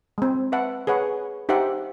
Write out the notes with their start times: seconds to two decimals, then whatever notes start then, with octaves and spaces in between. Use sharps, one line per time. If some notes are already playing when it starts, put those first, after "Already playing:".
0.18 G#3 C4
0.52 B4 E5 F#5 A5
0.87 G#4 B4 C#5 F#5
1.49 D#4 G4 C5 E5 F#5 G5